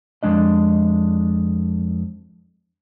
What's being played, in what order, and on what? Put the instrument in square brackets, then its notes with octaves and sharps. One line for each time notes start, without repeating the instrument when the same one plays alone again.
[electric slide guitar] F2 D#3 G#3 D4 D#5